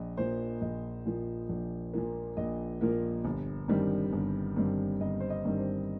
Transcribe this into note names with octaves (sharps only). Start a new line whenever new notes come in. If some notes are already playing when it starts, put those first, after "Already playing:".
Already playing: A#1 D#5
A#2 F3 A#3 C5
A#1 D#5
A#2 F3 A#3
A#1
A#2 F3 A#3
A#1 D#5
A#2 F3 A#3 A#4
G1
G2 D#3 G3 C4
G1
G2 D#3 G3 C4
G1 D#5
C5
D#5
G2 D#3 G3 C4
C5